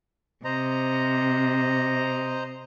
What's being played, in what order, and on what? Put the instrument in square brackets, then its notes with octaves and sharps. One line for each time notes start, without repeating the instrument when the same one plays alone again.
[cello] C3 [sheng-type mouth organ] C5 D#5 A#5